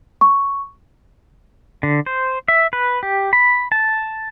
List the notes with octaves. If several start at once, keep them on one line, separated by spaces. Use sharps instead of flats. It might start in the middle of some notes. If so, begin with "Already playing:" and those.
C#6
D3
C5
E5
B4
G4
B5
A5